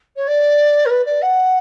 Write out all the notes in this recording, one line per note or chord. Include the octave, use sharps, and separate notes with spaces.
C#5
D5
A#4
B4
D5
F#5